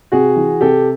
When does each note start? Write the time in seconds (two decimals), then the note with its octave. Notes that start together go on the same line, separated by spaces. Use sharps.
0.12 C3 F#4 G#4
0.36 E3
0.61 C3 G4 A4